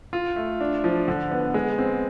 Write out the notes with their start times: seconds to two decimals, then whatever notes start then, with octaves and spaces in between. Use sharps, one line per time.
0.13 F4
0.36 A3
0.61 D4
0.84 F3
1.08 D3
1.31 B3
1.54 G#3
1.78 C4